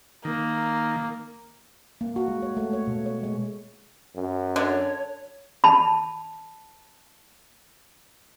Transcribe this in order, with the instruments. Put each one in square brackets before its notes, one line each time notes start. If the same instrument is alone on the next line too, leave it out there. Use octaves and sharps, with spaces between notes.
[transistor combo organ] D#3 [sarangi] A#3
[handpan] A#3
F#4
G#3
C#5
A3
C#5
B2
C#5
G#3
[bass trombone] F#2
[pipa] D3 [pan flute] C#5
[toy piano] A5 B5